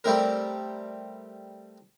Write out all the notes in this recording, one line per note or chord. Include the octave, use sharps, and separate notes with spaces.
G3 A3 C4 A#4